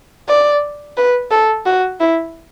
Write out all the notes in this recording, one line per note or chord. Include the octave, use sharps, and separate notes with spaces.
D5
B4
A4
F#4
E4